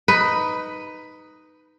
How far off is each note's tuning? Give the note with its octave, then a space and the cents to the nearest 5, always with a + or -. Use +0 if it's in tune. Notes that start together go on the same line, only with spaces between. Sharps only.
D#4 +0 B4 +10